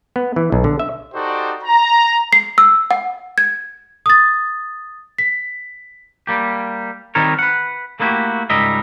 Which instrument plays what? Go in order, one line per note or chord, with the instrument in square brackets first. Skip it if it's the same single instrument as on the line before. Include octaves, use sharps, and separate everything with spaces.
[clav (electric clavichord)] B3
E3
B1
D3
E5
[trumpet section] D#4 F#4 G4 A4 C5 D5
A#5
[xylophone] C7
E6
F#5
G#6
[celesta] D#6 A6
B6
[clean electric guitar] G3 A#3 G4
D#3 G3 C4 D#4 A#4 C#5
B4 F#5
A3 A#3 D#4 E4 F#4 G4
C#2 G#2 G3 A#4 D#5 E5